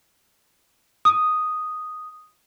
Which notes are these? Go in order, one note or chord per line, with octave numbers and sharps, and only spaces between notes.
D#6